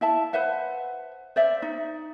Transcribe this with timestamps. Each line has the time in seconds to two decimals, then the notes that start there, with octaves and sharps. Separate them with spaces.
0.01 E4 E5 A5
0.33 B4 C5 E5 F#5
1.36 C5 D5 E5
1.62 D#4